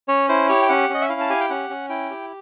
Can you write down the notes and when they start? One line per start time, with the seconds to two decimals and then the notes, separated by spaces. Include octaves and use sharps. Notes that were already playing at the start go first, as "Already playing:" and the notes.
0.08 C#4 C#5
0.29 E4 C5
0.49 G4 C#5
0.62 G5
0.69 C#4 F#5
0.89 C#4
0.94 D#5
1.02 E5
1.09 E4 F5
1.20 A5
1.30 G4 G#5
1.40 G5
1.50 C#4 F#5
1.70 C#4
1.89 E4 G5
2.10 G4